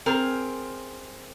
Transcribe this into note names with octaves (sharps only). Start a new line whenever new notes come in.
C4 G#4 A#4